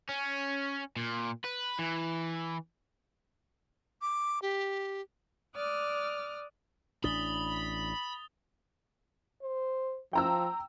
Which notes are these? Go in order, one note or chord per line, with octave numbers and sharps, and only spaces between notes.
C#4
A#2
B4
E3
D6
G4
D5 D6 D#6 F6 F#6
A1 D4 B5 D#6 A6 G7
C5
F3 G5 A#5 E6